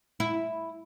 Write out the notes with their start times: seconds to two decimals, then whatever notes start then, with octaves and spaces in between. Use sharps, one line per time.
0.20 E4